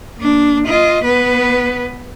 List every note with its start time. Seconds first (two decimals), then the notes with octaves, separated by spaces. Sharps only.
0.17 A#3 D4
0.67 F4 D#5
1.04 B3 B4